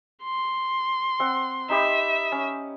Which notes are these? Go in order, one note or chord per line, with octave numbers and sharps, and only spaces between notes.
C6
C4 F#5
D#4 G4 E5 B5
C#4